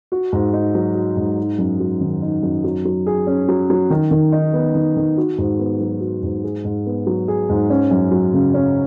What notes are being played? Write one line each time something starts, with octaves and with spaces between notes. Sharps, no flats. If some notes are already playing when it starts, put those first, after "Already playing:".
F#4
G#2
D#4
F#3
F#4
G#2
D#4
F#2
F#3
D#3
D#4
F#2
F#3
F#3
G#4
C#4
F#3
F#3
D#3
D#3
D#4
B3
D#3
D#3
F#4
G#2
B3
F#3
F#4
G#2
G#4
G#2
B3
F#3
G#4
G#2
C#4
F#2
F#3
C#3
C#4